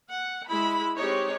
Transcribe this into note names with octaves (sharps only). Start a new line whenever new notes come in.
F#5
G#3 E4 B5
G#3 C4 D#4 G4 C#5